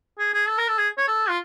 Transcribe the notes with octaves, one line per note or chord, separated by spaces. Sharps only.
G#4
G#4
A4
A#4
A4
G#4
C#5
A4
F4